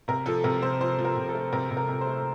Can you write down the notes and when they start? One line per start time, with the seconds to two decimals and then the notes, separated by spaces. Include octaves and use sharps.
0.08 C3 A#4
0.26 F3 A4
0.44 C3 A#4
0.62 C3 C5
0.81 F3 C5
0.99 F3
1.05 A#4
1.16 C3
1.29 A4
1.35 A3
1.53 C3 A#4
1.71 C3
1.77 A#4
1.89 C3
2.01 C5
2.07 A3